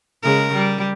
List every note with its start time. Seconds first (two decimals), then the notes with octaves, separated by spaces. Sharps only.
0.23 C#3 G#3 A#4
0.53 G3